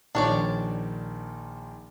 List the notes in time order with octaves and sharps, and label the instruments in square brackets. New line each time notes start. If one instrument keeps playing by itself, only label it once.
[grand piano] A#1 D#3 F3 [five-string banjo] D4 C#5 D5